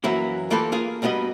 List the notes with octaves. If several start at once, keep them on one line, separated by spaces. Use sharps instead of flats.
F#2 E3 F#3 A#3 E4
E3 A#3 F4 G4 A4 B4
A#3 F4 G#4
G2 G3 B3 F#4 D#5